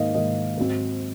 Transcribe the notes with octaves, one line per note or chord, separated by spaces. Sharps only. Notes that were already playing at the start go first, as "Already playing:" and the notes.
Already playing: G#2 D#3 A#3 D#5 F5
G#2 D#3 A#3 D#5
G#2 F#3 C4